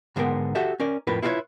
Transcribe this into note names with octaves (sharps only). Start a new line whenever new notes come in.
G#2 D3 G#3 B3 A#4 G5
F#4 G4 A4 E5
C#4 A#4 D5
F2 A2 F4 A#4 B4
E4 F4 G4 A4 B4 C#5